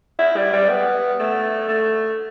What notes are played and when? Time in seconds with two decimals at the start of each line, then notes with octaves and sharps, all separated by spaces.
0.19 E4
0.36 G3
0.53 G3
0.69 B3
1.20 A3
1.68 A3